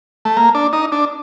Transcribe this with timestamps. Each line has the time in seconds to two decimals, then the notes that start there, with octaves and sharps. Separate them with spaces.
0.25 A3
0.37 A#3
0.55 D4
0.73 D#4
0.92 D4